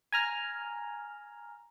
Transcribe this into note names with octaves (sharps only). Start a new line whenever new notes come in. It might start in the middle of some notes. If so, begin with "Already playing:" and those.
G#5 A#5 F6